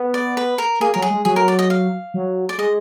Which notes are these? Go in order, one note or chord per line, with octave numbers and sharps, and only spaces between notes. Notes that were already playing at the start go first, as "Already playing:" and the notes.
Already playing: B3
D5
B4
A#4
A#3 G#4
F#3 A#4
G#4
G#3
F#3 G#4
A#4
D5
D#5
F5
F#3
D5
G#3 D#5